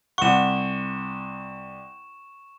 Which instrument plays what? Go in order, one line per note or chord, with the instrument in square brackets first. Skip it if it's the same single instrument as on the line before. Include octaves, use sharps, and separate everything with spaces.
[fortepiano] C2 F#5 [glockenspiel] C#6 E7